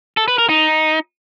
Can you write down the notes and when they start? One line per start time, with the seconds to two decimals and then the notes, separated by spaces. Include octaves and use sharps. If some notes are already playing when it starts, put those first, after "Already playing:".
0.17 A4
0.28 B4
0.39 A#4
0.49 D#4